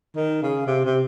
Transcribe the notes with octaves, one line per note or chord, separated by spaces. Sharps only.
D#3
C#3
C3
C3